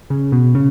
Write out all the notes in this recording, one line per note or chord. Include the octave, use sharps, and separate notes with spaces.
C#3
B2
C#3